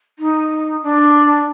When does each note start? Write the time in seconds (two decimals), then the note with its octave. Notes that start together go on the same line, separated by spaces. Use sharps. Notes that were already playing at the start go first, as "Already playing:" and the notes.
0.19 D#4
0.83 D4